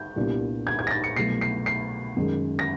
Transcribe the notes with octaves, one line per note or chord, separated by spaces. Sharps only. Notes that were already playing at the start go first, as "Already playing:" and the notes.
Already playing: G6
C2 A#2 G3 B3 D4
G#6
G#6
A#6
A6
C#7
C2 B2 F#3 A3 C7
C7
C7
F#2 D#3 G#3
A#6